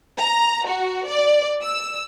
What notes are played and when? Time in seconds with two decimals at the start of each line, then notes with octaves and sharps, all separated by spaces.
0.19 A#5
0.68 F#4
1.07 D5
1.62 E6